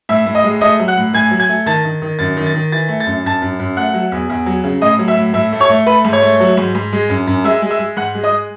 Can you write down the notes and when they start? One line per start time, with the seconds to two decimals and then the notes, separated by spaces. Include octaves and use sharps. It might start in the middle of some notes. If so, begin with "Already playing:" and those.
0.09 A2 E5 E6
0.26 A2
0.35 D#5 D#6
0.44 G#3
0.61 A3 D#5 D#6
0.79 F#3
0.88 F#5 F#6
0.97 A2
1.13 A2 G#5 G#6
1.31 F#3
1.40 G#5 G#6
1.49 A3
1.66 D#3 A5 A6
1.85 D#3
2.02 D#3
2.19 F#2 A6
2.37 D#3
2.46 A6
2.54 D#3
2.72 E3 A6
2.89 A3
3.00 A6
3.07 F#2
3.24 F#2 A5 A6
3.42 F#2
3.59 F#2
3.77 A3 F#5 F#6
3.94 F#3
4.12 E2
4.30 E2
4.46 F#3
4.64 C#3
4.82 A2 D#5 D#6
4.99 F#3
5.08 E5 E6
5.17 A2
5.34 A2 E5 E6
5.53 A3
5.61 C#5 C#6
5.70 A3
5.86 A3 B4 B5
6.05 G#2
6.13 C#5 C#6
6.23 A3
6.40 F#3
6.57 G#2
6.75 G#2
6.93 G#3
7.09 F#2
7.27 F#2
7.44 G#3 E5 E6
7.62 G#3
7.71 E5 E6
7.79 G#3
7.97 G#2 F#5 F#6
8.15 G#3
8.24 D#5 D#6